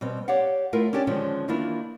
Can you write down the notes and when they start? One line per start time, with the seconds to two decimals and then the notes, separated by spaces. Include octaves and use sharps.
0.01 B2 G3 C4
0.28 G4 C#5 D5 F5 F#5
0.73 A3 E4 F4 A#4
0.93 C#4 D4 G4 A4 D5
1.07 D3 D#3 F3 G#3 C#4
1.48 D#3 E3 A#3 D4 E4 F4